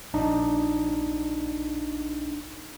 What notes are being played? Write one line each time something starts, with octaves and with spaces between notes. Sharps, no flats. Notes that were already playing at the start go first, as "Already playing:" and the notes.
A#1 D4 D#4